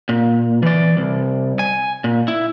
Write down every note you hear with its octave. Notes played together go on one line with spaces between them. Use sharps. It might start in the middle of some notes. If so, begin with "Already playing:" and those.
A#2
E3 D5
C2
G#5
A#2
E4